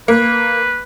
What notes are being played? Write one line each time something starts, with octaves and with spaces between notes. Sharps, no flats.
A#3 B4